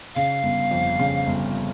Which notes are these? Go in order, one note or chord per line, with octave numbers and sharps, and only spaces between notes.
C#3 F5
G1
F2
C#3
G1